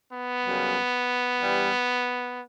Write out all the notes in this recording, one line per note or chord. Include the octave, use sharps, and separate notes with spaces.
B3
F#2 C#3 G3
G2 E3 G3